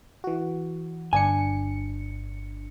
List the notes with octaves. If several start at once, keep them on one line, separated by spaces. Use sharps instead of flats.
E3 F#4
G1 D4 G#5 C#7